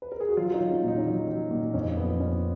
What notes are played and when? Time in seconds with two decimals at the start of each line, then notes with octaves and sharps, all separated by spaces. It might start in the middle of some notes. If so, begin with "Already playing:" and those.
0.02 B4
0.12 A#4
0.20 G#4
0.29 F#4
0.37 F#3 F4
0.51 F4
0.54 D#4
0.60 F#3
0.71 C#4
0.83 A#2
0.88 D#4
0.98 C#4
1.06 F#3 D#4
1.28 F#3
1.51 A#2
1.74 F2 C#4
1.97 F3 B3
2.20 F2 C#4